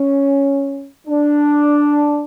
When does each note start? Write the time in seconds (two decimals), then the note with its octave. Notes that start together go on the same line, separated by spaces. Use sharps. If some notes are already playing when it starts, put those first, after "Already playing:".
Already playing: C#4
1.07 D4